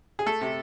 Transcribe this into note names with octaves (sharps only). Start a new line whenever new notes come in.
G#4
A3 A4
C3